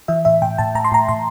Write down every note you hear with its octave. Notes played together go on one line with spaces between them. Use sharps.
E3 E5
A2 E5
A2 G5
A2 A5
A2 A#5
C6
A2 A#5
A2 C6